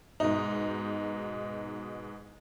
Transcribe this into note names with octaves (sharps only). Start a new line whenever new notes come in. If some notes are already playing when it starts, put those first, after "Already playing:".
G#2 B2 D#4